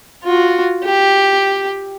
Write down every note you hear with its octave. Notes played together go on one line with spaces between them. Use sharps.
F4 F#4
G4